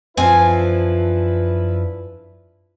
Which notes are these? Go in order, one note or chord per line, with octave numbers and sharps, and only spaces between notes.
F#2 F3 C4 D4 E4 B4 G#5